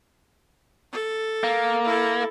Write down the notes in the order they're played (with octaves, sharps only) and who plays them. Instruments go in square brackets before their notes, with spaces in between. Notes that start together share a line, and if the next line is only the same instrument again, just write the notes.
[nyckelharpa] A4
[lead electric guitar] A#3
[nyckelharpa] E4 A4